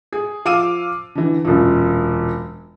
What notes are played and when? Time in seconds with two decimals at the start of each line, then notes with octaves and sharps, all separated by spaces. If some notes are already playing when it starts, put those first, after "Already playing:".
0.13 G#4
0.45 F3 F5 D6 E6 D#7
1.15 D3 E3
1.45 E1 F#2 A#2